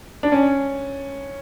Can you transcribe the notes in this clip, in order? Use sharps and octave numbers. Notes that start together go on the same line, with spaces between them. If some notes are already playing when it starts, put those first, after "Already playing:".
D4
C#4